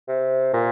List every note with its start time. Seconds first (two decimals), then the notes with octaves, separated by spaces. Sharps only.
0.08 C3
0.53 A#2